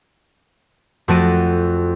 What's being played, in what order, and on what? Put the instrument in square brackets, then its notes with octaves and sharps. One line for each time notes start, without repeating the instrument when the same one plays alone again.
[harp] F2 A3 F#4 A5 D7 D#7